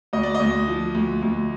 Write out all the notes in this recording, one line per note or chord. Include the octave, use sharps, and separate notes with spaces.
D2 D#5
D5
D#5
D2
F3
D2
D2